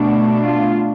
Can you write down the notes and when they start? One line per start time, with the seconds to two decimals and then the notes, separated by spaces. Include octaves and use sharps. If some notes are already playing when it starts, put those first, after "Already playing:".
Already playing: B2 A3 D4
0.44 F4